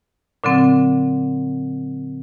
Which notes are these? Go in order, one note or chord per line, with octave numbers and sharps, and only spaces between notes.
A#2 D3 F#3 C4